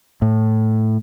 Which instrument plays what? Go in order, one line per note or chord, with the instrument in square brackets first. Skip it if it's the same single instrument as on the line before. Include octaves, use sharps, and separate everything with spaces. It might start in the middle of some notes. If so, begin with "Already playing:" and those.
[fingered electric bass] A2